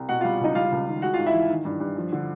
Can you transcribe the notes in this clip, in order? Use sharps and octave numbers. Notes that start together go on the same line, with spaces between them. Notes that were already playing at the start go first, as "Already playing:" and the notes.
Already playing: C2
B2 F#4 F#5
G3 F4 F5
C#2 D#4 D#5
G3 F4 F5
C#2
D#3
G#3 F#4 F#5
G#2 F4 F5
E4 E5
E3
D#3
G2
G2
F3
D3